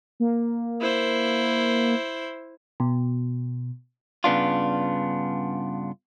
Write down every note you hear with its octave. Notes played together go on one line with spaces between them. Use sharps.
A#3
E4 C5
B2
G2 C#3 B3 D4 F4